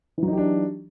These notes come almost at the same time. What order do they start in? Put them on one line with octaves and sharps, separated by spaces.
E3 F#3 D#4 G4 D4